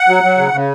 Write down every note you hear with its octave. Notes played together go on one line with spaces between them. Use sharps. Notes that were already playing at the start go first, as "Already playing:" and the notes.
Already playing: F#5
F#3
F#3
C#3
C#3